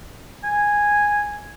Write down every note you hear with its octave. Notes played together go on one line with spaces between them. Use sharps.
G#5